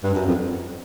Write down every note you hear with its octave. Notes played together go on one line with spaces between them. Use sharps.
G2
F#2
F2